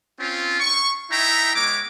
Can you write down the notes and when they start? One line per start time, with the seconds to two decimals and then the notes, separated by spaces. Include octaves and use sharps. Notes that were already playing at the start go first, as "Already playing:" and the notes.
0.20 C4 C#4 F4
0.60 C#6
1.11 D#4 E4 E5 G5 A#5
1.56 G#3 B3 C#5 D6